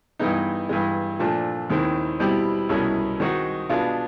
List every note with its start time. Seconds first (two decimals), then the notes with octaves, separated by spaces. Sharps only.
0.19 G2 E3 G#3 B3 D#4
0.69 G2 E3 G#3
1.19 A#2 F3 A3 D4
1.70 D#2 D#3 G#3 C4 E4
2.20 B2 G3 C4 E4 G4
2.69 C2 B2 G#3 C#4 E4
3.20 D#3 G#3 C4 D#4 F#4
3.70 B2 G#3 B3 D4 F4